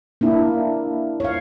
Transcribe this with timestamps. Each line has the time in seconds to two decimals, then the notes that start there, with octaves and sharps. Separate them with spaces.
0.21 A#3 D4 E4
1.20 C#5 F5